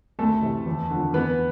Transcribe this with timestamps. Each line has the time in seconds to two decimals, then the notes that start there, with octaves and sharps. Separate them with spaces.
0.19 D2 A3 A4
0.42 C3 E3
0.67 E2
0.90 D3 F3
1.13 E2 B3 B4